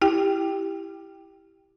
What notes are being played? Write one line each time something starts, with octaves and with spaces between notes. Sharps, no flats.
E4 G4 G5